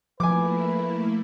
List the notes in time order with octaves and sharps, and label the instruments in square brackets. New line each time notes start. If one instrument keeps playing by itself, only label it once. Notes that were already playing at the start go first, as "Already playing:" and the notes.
[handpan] F3 [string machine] A3 A#3 E4 [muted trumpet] B4 [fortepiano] G#5 D6